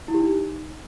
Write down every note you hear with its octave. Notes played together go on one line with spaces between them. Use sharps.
E4
G4
D#4